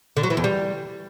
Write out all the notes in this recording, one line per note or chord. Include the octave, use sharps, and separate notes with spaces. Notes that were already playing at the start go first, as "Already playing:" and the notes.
D3
F#3
E3
E2
G3